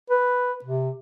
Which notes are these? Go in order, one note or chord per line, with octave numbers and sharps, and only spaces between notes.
B4
C3